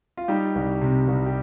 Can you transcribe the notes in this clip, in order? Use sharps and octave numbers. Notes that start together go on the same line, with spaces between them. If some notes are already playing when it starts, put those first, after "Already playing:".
F4
G3 D#4 G4
C2
C3
C2
G4